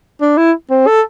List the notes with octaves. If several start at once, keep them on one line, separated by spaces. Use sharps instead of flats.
D4
E4
C4
A4